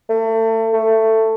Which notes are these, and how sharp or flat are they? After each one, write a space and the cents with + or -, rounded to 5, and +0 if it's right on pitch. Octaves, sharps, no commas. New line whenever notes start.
A3 +30
A3 +15